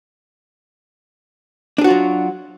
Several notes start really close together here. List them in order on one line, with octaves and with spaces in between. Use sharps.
D4 G#4 F#4 F4 F#3